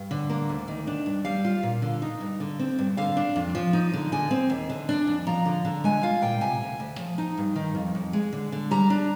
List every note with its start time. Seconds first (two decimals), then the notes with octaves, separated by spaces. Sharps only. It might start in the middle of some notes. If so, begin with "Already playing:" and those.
Already playing: G2
0.11 D3
0.30 A#3
0.49 D2
0.68 D#3
0.87 D4
1.06 G2
1.25 G3 F5
1.45 F4
1.63 A#2
1.82 D3
2.02 D#4
2.20 G2
2.40 D3
2.59 C4
2.79 G2
2.97 D3 F5
3.17 D4
3.36 F2
3.55 F3
3.73 D#4
3.93 D3
4.12 D3 G#5
4.31 C4
4.50 D#2
4.70 D3
4.89 D4
5.07 F2
5.27 F3 A#5
5.45 D3
5.65 D3
5.84 G#3 G#5
6.03 F4 F5
6.22 A#2 G5
6.41 C3 G#5
6.60 D2
6.80 D2
6.99 F3
7.18 D#4
7.38 G2
7.56 D#3
7.75 F2
7.95 F2
8.13 G#3
8.33 D3
8.52 D3
8.71 G3 A#5
8.90 D4